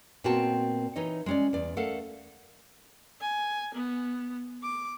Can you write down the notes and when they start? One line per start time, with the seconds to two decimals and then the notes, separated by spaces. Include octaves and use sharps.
0.24 A#2 B3 C4 F#4 G5 A5
0.96 E3 D#4 C#5 D#5
1.26 G#3 C#4 D5
1.53 E2 D5
1.77 A3 A4 A#4 F5 F#5
3.21 G#5
3.74 B3
4.63 D6